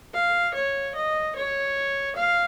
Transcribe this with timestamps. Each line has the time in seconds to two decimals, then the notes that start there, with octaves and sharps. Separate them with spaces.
0.14 F5
0.54 C#5
0.95 D#5
1.35 C#5
2.16 F5